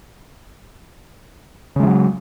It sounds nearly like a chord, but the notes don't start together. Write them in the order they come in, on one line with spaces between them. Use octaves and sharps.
C#3 G#3 E3 F#3